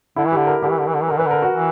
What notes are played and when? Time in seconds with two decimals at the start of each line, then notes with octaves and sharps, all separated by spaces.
0.16 D3 E4
0.27 E3
0.32 D3 G4
0.47 A#4
0.62 D3 G4
0.70 E3
0.79 D3
0.87 E3
0.94 D3
1.02 E3
1.08 D3 A#4
1.18 E3 B4
1.26 D3 A#4
1.42 F#4
1.54 E3